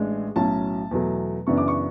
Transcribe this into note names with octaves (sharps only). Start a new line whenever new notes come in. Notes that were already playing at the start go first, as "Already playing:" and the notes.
Already playing: A1 G#3 D4
B1 A2 F#3 C#4 A5
E2 B2 F#3 A3
F#2 C#3 E3 B3 D4 C#6
D6
C#6